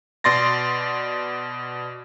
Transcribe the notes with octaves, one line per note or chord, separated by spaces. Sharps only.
B2 D5 C6 A6 A#6